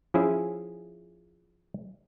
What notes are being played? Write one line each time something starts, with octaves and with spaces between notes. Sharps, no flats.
F3 C#4 E4 G#4 E5